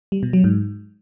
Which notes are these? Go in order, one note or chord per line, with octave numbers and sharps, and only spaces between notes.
G3
B2
F#3
G#2